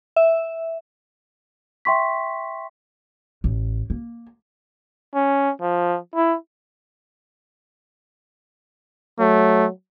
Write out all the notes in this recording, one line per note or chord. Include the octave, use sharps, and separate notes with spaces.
E5
E5 G5 C6 C#6 B6
A1
A#3
C#4
F3
E4
F#3 A3